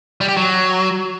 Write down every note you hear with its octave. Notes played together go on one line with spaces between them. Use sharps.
G3
G4
F#3